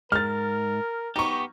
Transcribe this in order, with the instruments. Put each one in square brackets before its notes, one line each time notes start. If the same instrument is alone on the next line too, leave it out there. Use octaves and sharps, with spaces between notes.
[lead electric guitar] G#2 [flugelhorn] A#4 [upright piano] F6 A6
[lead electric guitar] B3 G4 [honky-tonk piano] D#4 C#6